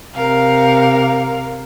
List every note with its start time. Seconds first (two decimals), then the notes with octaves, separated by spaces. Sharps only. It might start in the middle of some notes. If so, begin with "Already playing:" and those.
0.13 C3 A#4 F5